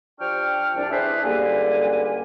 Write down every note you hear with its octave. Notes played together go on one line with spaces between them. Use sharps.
F3 D4 G4 G5 C#6 F6
C2 D4
D4 E4 G#4 B4 C5
C#2 D3 G3 A#3 G4 G#5